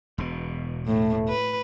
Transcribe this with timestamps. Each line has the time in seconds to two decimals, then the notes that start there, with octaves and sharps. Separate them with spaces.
0.18 E1 B2
0.87 A2 A3
1.28 B4